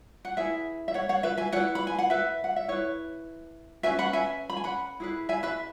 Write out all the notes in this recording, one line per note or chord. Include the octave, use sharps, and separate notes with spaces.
F#5
E4 G#4 B4 E5 G#5
E5
C#5 F#5
C#5 F#5
B4 E5
E5 G#5
E4 B4 C#5 F#5
B5
G#5
F#5
B4 E5
F#5
E5
E4 B4 C#5
C#4 F#4 B4 E5 G#5
F#5 B5
E5 G#5
B5
G#5
F#5 B5
E4 G#4 B4
E5 G#5
B4 E5